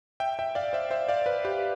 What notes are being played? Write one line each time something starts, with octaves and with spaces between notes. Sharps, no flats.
E5 G5
E5 G5
D5 F5
C5 E5
C5 E5
D5 F5
B4 D5
G4 B4